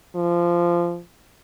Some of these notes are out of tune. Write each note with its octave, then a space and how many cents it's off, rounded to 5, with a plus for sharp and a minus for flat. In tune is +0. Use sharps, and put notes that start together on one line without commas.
F3 -15